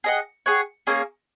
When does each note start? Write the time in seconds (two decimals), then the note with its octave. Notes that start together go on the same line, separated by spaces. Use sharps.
0.04 G#4 D#5 F#5
0.46 G#4 C#5 F#5
0.87 A#3 C#4 G#4